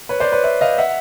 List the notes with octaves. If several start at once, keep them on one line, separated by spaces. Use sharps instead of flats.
B4 C#5
C5 D5
B4 C#5
D5 E5
D#5 F5
E5 F#5